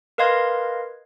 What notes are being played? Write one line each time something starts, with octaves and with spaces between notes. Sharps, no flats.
A#4 B4 D#5 F5 C6 G#6